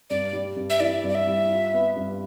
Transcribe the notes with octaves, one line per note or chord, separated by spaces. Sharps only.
G2 D5
G3
G2
E5
E3 D5
G2
D5
E5
G3
F4
B3
G2